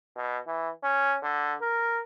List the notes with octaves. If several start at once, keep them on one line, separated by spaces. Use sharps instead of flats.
B2
E3
C#4
D3
A#4